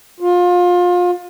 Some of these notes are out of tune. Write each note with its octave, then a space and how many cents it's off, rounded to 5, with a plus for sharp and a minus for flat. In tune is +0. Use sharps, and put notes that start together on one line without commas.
F4 +25